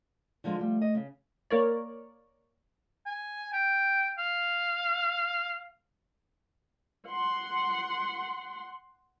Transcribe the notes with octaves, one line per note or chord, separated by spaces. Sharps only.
D3 F3 G#3
F3 G3 A3
D#5
C#3
A#3 A#4 C#5 D5
G#5
G5
F5
F#5 C6